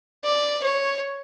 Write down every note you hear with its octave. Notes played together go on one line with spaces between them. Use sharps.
D5
C#5